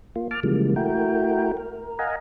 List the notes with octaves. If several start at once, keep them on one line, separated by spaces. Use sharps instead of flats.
A#3 F4
A5 D6 F6
C#3 E3 F3 G3 G#3 A#3
A3 E4 F#4 A#4 G5
A#4
D#5 F5 F#5 G#5 A#5